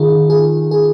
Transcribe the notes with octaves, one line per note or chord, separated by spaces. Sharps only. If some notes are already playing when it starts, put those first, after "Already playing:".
Already playing: D#3 F4 G#4
G#4
G#4